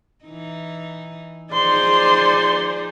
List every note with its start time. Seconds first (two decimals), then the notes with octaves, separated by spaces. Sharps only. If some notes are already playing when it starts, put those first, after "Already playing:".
0.25 E3 D#4
1.53 F3 D#4 G#4 C5 D5 C6